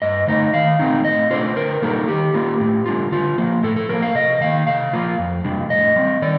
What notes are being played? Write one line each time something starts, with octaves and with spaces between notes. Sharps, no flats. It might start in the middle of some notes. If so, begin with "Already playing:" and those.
G2 D#5
D3 A3 D#4 D#5
D#3 F5
A3 C4 D#4
A2 D#5
A3 D4 F4 C5
D3 A#4
G3 A#3 D#4 A4
D#3 G4
A#3 F4
A2
G3 D4 F4
D3 F4
F3 A#3
A2 A4
A4
F3 A#3 A#4
F5
C3 D#5
D#3 A#3 F5
C3 F5
F3 A#3 F4
F2
C3 G3 D4
A2 D#5
G3 C4
D#3 D5